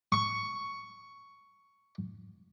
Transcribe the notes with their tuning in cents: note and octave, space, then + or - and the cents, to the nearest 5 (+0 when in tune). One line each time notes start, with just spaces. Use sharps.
C#6 +5